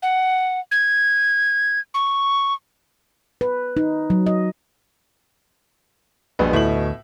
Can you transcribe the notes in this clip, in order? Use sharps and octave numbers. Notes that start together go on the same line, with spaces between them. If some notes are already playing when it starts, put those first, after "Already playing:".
F#5
G#6
C#6
B4
D#4
F#3
D#5
A#1 G2 B2 G#3 B4
D2 A2 E5 F#7